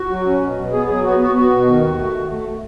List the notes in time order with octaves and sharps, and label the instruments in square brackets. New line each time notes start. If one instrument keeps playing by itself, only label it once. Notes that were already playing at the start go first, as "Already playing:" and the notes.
Already playing: [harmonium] F#4
F#3
C#4
B2
B2
B3 G#4
F#3 G#4
B3 F#4
B3 F#4
B3 F#4
B2
D#3
D#2
A3
D#2
A3